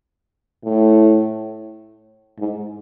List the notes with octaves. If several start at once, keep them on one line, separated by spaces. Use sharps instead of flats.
A2
G#2